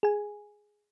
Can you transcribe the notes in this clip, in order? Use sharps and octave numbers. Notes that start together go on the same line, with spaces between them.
G#4 G#5